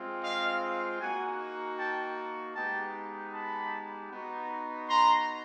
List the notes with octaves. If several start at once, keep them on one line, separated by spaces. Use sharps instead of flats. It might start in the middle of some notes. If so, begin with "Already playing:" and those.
Already playing: G#3 C4 F4
D#5 F5
A#3 D#4 F#4 F#5 G#5
G5 A5
G#3 B3 D#4 G4 G5 A5
A5 B5
B3 D#4 F#4
A#5 C6